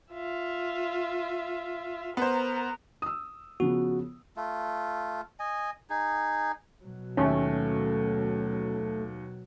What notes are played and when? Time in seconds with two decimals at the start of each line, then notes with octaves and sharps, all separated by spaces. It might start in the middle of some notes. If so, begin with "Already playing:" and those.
0.13 F4 E5
2.17 B3 A#4 C5 A#5
3.02 D#6 E6
3.60 C#3 F3 B3 F#4
4.37 A3 F4
5.39 D#5 G#5
5.90 D#4 G#4
6.85 B2 F#3
7.17 D#2 A3 C#4